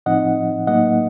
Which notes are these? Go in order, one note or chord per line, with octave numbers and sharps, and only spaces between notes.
A2 F3 C4 D#4 D#5 F#5
A2 F#3 A#3 D#4 D#5 F#5